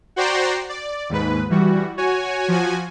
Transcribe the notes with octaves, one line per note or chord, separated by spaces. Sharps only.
F#4 C5 D5 G5 A#5 C6
D5
D#2 G#2 B4
E3 G3 F#4
F#4 C#5 G#5
F3 F#4 G#5